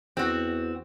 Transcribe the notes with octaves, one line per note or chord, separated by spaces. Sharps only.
E2 C4 F#4